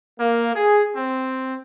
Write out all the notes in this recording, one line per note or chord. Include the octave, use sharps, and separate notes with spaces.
A#3
G#4
C4